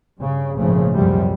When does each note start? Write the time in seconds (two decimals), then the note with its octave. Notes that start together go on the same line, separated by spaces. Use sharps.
0.19 G2 C#3
0.57 G#1 A#2 C#3 F3 A3
0.93 C#2 F#2 C3 F3 G3